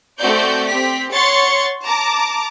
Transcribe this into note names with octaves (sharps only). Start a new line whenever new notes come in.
A3 C4 F#4 D5 G6
C4 G4 B6
C#5 F#5 C6 C#6 A6 C#7
A5 A#5 D6